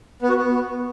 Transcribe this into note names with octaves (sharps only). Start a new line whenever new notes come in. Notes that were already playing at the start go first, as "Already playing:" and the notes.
B3
F#4
B3